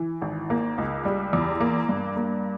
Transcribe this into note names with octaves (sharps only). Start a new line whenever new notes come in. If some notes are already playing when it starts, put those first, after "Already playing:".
Already playing: E3
G#1
A#3
C#2
G3
E2
A#3
G2
A#3